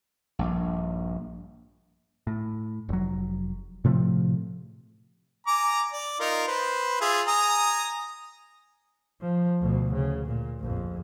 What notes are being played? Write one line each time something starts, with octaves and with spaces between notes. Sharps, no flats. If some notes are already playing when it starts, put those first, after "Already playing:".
A#1 G2
A2
F1 F#3
A2 C3 F3 A3
G#5 A#5 D6
D5
D#4 F4 A#4
B4 C5
F4 G#4 E5
G#5 A#5 D#6
F3
D2 B2
C#3
A#2
A#1 F2